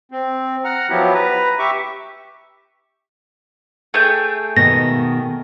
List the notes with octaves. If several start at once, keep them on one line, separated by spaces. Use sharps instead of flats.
C4
F#5 A#5 F6
F3 F#3 B3 E4 G4
B4 A#5
G4 E5 C#6 D6
A3 G#4 G5
B2 D#3 B3 A#6